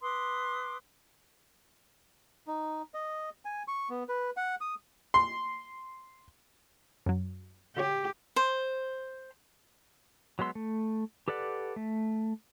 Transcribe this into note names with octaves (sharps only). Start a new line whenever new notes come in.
B4 C6 D6 D#6
D#4
D#5
G#5
C#6
B3
B4
F#5
D#6
C6
F#2 F#3
D3 F#4 G4 C#5
C5
F#3 G#3 B3 C6 E6
A3
G4 A4 B4 D5 F#5
A3